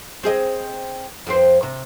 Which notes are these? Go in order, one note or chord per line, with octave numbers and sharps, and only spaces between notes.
C4 G#4 D#5
F2 C4 C5
C3